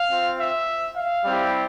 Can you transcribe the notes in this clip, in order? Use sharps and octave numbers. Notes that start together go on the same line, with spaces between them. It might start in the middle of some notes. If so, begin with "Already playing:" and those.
Already playing: F5
C4 F4
E5
F5
G3 C4 E4 G4